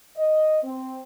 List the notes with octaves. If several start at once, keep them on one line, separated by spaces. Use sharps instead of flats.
D#5
C4